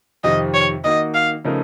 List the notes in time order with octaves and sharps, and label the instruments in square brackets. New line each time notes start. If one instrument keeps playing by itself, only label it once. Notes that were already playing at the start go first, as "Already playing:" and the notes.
[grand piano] F2 C3 D#3 [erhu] D#5
[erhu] C#5
[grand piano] D#3 A#3 D#4 F#4 [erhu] D#5
[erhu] F5
[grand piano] C#3 F3 A3 D#4 A#4